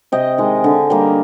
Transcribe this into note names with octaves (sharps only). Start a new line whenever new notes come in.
C3 D#5 G5
D#3 G#3
D3
G3 A#3